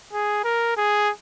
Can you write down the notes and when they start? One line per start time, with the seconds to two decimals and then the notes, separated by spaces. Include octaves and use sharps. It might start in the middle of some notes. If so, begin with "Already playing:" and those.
0.13 G#4
0.44 A#4
0.77 G#4